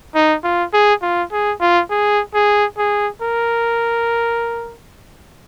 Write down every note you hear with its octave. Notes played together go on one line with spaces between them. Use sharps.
D#4
F4
G#4
F4
G#4
F4
G#4
G#4
G#4
A#4